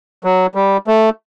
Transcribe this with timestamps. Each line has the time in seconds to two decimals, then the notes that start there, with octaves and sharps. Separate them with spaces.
0.24 F#3
0.55 G3
0.87 A3